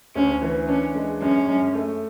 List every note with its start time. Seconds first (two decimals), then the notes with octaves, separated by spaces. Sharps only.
0.15 D2 C#4
0.41 E3
0.68 C#4 D4
0.95 G#3
1.21 F#2 C#4
1.48 F#2
1.74 A3